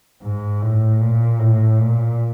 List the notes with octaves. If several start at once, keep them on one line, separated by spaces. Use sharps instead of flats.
G#2
A2
A#2
A2
A#2